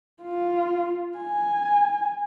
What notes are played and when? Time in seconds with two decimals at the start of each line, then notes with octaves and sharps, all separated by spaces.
0.22 F4
1.18 G#5